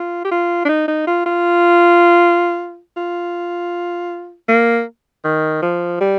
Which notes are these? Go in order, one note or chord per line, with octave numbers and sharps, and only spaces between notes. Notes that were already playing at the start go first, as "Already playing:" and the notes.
Already playing: F4
G4
F4
D4
D#4
D#4
F4
F4
F4
A#3
D#3
F3
G3